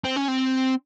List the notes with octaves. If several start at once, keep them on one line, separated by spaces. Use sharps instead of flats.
C4
C#4
C4